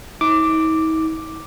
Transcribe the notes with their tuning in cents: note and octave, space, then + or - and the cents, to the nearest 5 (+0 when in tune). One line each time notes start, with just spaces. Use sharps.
D#4 +45 D6 +0